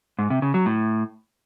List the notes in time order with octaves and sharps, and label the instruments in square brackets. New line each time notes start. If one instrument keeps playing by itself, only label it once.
[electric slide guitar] G#2
C3
C#3
F#3
A2